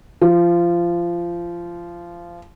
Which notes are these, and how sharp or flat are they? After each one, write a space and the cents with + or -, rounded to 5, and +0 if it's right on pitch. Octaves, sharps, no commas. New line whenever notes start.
F3 -20